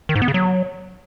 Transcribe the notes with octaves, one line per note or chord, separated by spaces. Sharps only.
D#3
G#2
B3
C#3
F#3